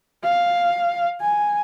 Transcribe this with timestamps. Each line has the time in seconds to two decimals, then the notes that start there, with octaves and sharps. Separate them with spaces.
0.23 F5
1.21 G#5